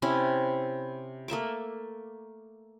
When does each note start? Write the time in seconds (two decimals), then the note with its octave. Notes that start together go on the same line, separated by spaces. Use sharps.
0.02 C3 C#4 E4 B5
1.28 A3 A#3 E5 D6